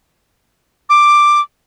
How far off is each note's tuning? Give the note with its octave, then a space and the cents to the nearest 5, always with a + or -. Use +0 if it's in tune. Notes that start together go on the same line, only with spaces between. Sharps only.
D6 +5